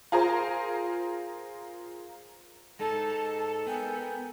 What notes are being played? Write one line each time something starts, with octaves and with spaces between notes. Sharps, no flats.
F4 G#4 A#4 C5
G#3 D#4 A4 A5
B3 A#4 G5 G#5